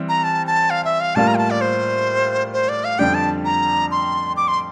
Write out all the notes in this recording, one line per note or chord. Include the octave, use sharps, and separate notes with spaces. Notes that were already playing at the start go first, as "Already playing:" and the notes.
Already playing: E3 G3 C4
A#5
A5
A5
F5
E5
F5
A2 G3 A#3 F4 A5
A#5
G5
A5
D5
C5
C5
D5
F5
F2 D3 G3 D4 G4 G5
A5
A#5
C6
D6
C6